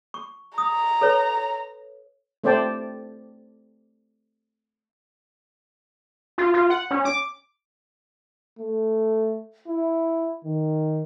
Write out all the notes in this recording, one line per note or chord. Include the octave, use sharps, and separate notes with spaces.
C#6
A#5 D#6
A4 B4 C#5
A3 C4 C5 D5 G5 A5
F4
F4
F#5
C#4
D6
A3
E4
D#3